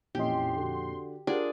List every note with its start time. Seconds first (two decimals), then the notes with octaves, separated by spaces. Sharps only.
0.15 F2 A#2 E3 C#4 G4 D#5 C6
0.56 D3 F#4
1.27 D4 F4 G4 G#4 A#4 D5 F#5